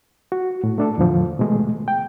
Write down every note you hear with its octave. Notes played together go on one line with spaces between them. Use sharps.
F#4
A2
A3 D4 A4
E2 A2 D3 F3
B2 D#3 G#3 A3
G5